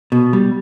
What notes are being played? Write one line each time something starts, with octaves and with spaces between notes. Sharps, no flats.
B2
G3